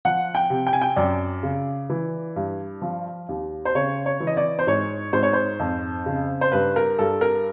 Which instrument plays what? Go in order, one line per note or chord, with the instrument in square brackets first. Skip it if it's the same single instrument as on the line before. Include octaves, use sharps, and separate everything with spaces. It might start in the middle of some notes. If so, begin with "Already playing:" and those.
[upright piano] F3 F#5
G5
C3
G5
G#5
G5
F#2 D5
C#3
E3
G2
F3
D#2
C5
C#3 C#5
C#5
E3
D#5
D5
C5
G#2 C#5
G#2 C5
C#5
C5
F2
C#3
C5
G2 B4
A#4
G2 A4
A#4